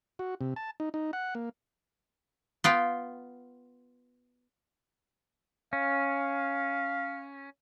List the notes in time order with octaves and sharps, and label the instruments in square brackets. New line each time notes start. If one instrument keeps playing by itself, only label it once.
[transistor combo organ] F#4
C3
A5
D#4
D#4
F#5
A#3
[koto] B3 F4 G5
[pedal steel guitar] C#4 [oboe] F5